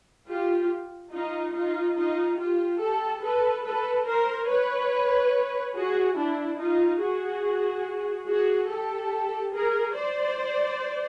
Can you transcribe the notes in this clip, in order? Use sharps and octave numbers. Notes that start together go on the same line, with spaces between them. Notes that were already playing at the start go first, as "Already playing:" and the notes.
F4 G4
D#4 F4
D#4 F4
D#4 F4
F4 G4
G4 A4
A4 B4
A4 B4
A#4 C5
B4 C#5
F#4 G#4
D4 E4
D#4 F4
F#4 G#4
F#4 G#4
G4 A4
G#4 A#4
C5 D5